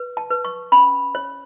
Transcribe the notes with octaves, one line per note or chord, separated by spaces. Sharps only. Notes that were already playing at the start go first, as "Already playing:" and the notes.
Already playing: B4
A5
B4
C#6
C#4 B5
C#5